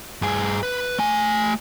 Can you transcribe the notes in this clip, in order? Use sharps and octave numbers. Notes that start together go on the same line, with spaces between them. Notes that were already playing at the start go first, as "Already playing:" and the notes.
G2 G#4
B4
A3 G#5